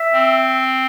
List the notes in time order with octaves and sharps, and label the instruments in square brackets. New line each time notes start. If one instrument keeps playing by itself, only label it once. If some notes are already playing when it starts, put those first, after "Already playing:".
Already playing: [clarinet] E5
[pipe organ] C4